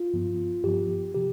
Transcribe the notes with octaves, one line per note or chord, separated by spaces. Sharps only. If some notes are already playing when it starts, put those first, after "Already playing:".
Already playing: F4
G2 F3 B3
G2 F3 B3 G4
C3 F3 G4